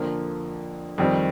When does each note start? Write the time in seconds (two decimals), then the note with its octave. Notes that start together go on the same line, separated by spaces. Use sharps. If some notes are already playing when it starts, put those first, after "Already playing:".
Already playing: F2 D3 F3 A#3
0.98 F2 D#3 G3 C4